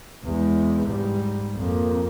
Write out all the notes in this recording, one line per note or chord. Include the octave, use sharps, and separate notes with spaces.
E2 G#3
G#2 G3
F2 A#3